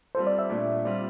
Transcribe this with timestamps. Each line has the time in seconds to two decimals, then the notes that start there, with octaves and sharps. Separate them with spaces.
0.15 G3 C4 F4 A4 C5
0.27 D5
0.39 E5
0.50 A#2 A3 D4
0.85 G3 C4 F4 D5